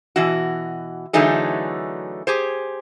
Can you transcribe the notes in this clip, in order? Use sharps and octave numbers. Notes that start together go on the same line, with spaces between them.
B2 E3 F#4
D3 E3 F#3 A3 D#4 G#4
G4 G#4 C5